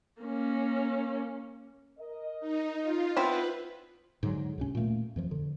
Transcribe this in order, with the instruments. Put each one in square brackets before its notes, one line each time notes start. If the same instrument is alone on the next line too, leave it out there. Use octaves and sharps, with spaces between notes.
[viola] A#3 C#4
[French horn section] A#4 D#5
[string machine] D#4
F4
[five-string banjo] B3 C4 E4 [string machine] B4
[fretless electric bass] G#2 D3 F3 F#3
C#2 C3 C#4
A#2 D#3 A3 A#3
F2 E3 F3
D3